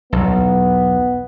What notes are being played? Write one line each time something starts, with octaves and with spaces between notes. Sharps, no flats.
B1 E2 B3